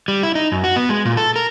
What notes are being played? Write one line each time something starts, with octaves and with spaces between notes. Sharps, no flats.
G3
E4
D#4
F#2
F#4
B3
G#3
A#2
A4
A#4